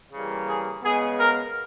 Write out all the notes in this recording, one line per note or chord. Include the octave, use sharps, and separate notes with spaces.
C#3 E3 G3 A#3
G#4
C#3 G#3 B3 G#4
A#4